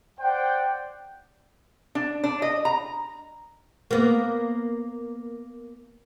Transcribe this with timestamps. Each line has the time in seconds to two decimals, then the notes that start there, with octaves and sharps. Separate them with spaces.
0.20 C5 D5 F#5 G5
1.95 D4
2.24 D4
2.42 D#5
2.65 A#5
3.91 A#3 B3